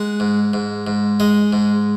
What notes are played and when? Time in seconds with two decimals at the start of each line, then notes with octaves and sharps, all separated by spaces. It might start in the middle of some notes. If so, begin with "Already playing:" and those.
Already playing: G#3 F#5
0.20 G#2
0.53 G#2
0.87 G#2
1.20 G#3 D#5
1.53 G#2